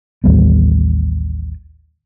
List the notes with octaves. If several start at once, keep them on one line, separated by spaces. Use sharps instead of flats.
A1 D#2 G3 B3